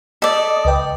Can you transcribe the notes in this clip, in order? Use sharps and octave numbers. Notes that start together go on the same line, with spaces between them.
A4 D5 D#5
C#2 B4 G5